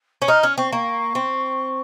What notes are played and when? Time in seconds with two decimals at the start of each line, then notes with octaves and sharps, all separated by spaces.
0.22 C#4
0.28 D#4 F6
0.42 C#4 F6
0.58 C4 C#6
0.72 A#3 C#6
1.15 C4